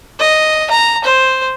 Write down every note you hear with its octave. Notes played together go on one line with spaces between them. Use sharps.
D#5
A#5
C5